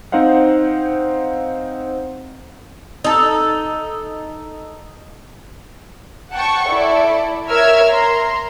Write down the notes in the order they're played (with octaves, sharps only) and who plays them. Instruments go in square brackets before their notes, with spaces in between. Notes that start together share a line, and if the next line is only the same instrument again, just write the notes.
[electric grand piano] C4 D#4 C5 F5 F#5
[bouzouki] D#4 A4
[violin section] F#5 G5 A5 C#6
E4 A4 D5
A#4 C#5 E5 E6 F6 G#6
A#5 C6